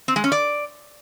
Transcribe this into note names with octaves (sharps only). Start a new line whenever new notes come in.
C4
G#3
C#4
D5